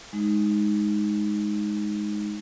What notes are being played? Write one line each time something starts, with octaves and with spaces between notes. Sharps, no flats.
G#3 D#4